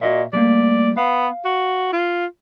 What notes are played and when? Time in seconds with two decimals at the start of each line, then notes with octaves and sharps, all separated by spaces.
0.01 A#2 F#4 D#5 E5
0.33 G3 A3 A#3 D5
0.97 B3 F5
1.45 F#4
1.93 F4